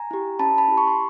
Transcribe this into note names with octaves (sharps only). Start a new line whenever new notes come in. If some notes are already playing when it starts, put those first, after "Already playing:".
Already playing: G#5 A#5
E4 G4
C#4 A5 B5
A5 B5
E4 G4
B5 C#6
C6